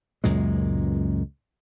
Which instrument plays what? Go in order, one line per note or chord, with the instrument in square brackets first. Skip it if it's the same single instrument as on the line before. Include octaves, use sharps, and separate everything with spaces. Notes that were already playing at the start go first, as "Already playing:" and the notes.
[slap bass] C#2 F#2 A#2 G#3